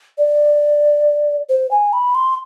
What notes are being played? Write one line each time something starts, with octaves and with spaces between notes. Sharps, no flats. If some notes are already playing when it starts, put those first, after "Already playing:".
D5
C5
G#5
B5
C6